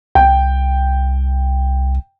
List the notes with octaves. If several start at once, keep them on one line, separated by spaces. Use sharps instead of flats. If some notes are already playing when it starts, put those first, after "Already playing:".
C2 G5